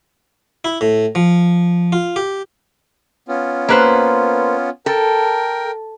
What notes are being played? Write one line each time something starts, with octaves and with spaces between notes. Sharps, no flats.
E4
A2
F3
F4
G4
B3 C#4 F4
A#3 B4 C5
A4 A#4 G5